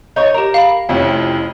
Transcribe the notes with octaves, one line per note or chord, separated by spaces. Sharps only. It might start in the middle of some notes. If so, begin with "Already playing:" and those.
D#4 C#5
G4 A#4 A#5
F5 B5
F1 F2 C#4 E4